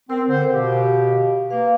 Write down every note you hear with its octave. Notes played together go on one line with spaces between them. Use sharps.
C4 A#4 E6
D3 C5
B2 G4 F5
A#3 B4 F5